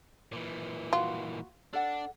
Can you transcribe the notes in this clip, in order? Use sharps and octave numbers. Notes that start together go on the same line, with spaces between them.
A#2 E3
F4 F#4
D4 A4 D5 F#5